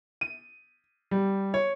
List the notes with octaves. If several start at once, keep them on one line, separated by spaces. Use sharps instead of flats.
D#7
G3
C#5